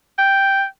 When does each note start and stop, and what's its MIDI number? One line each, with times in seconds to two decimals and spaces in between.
0.18 0.65 79